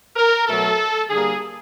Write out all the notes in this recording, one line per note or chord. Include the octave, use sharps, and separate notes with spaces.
A#4
B2 F#3 A3 A4
D3 G3 A#3 G#4